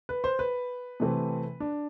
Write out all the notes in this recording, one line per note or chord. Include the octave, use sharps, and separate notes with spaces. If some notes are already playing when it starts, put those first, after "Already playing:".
B4
C5
B4
C3 E3 A3 C4
D4